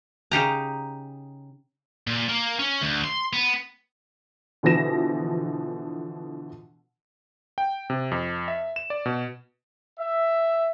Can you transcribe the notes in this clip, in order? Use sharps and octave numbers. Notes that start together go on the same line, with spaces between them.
C#3 D#4 G4 A#5
A#2
A#3
C#4
D2
C6
B3
B2 D3 E3 F3 A#6 E7
G5
C3
F2
E5
E7
D5
B2
E5